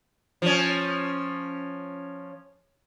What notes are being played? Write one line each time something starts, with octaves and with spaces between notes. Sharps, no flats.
F3 C#4